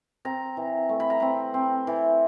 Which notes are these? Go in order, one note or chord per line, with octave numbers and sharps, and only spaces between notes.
C4 A#5
E3
A3
B5
A#5
C4 B5
C4
E3